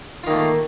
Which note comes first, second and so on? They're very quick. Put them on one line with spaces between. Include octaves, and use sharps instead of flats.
F4 D#3 A#3 A3